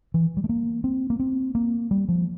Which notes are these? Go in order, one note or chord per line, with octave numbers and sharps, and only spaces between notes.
E3
G3
A3
A#3
C4
A#3
C4
A#3
G3
F3